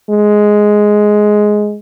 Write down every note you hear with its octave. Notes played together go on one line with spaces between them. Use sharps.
G#3